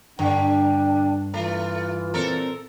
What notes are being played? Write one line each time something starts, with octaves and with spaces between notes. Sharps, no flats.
G2 D3 D4 G5
E3 A3 F4
A#2 C4 A4 A#4